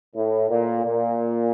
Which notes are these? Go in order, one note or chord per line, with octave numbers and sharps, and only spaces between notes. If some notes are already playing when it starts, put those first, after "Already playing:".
A2
A#2
A#2